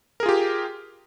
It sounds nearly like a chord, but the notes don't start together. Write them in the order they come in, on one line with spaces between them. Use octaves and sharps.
A#4 G#4 F4 G4